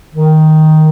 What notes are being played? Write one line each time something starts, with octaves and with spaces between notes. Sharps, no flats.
D#3